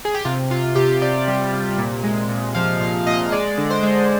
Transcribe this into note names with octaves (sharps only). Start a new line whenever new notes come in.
G#4
G4
C3 F4
C3 F4
C3 G4
C3 D5
G3
C3
A#2
G#3
A#2
F3 F5
A#2 F5
A#2 D#5
G#3 D5
D3
C5
G#3